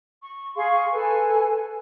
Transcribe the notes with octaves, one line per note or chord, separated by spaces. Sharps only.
C#6
G#4 F5 C6 C#6
A4 B4 G#5